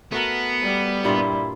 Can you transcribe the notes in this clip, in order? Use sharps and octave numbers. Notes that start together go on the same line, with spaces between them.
A3 B3 F#4 A#4
G3
G2 A#2 E4 F4